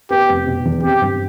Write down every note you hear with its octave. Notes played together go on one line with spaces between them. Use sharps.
B3 G4
F1
B2
E2
C4 G4
G2